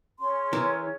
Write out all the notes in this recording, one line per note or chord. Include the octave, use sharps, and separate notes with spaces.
C#4 G#4 C#5 C6
E3 A#4